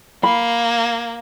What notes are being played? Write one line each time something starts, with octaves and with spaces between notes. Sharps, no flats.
A#3 B5